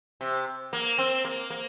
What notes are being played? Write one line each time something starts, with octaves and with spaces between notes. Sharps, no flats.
C3
A#3
C4
A#3
A#3